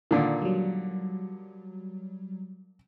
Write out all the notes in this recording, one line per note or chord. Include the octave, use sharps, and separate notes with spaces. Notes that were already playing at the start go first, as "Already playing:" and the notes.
A#2 D3 D#3
F#3 G3